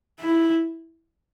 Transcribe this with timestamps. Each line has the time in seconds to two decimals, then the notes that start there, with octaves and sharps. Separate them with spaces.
0.20 E4